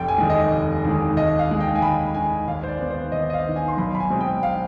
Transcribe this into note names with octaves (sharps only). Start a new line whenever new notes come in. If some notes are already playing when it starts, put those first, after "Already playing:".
Already playing: F1 G5
G#5
D#2 D#3 G#3
D#5
F1
D#2 D#3 G#3
D#2 D#5
F5
D#3 G#3
G5
G#5
D#2 B5
D#3 G#3 G#5
D#2 F5
C5
D5
D#3 B3
C5
D#2 D#5
D#5
F5
D#3 B3
G#5
C6
B1 B5
B5
G#5
B2 G#3 C4
G5
F5